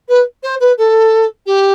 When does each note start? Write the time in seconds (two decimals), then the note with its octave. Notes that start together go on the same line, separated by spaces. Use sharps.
0.08 B4
0.43 C5
0.60 B4
0.78 A4
1.46 G4